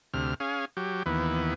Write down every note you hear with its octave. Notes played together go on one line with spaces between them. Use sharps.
D2 C3 F6
C#4 G#4 F5
F#3 G4
D#2 E3 B3